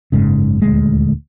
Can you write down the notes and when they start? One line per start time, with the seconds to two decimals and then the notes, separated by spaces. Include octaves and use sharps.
0.12 F#1 G#2 C#3
0.62 D#1 D2 G#3